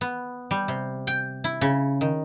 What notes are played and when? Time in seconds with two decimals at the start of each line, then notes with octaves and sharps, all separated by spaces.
0.01 B3
0.51 G3
0.68 C3
1.07 G5
1.44 E4
1.61 C#3
2.01 D#3